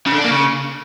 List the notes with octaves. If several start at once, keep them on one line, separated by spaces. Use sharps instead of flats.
C#3
D3
D4
A#3
C#3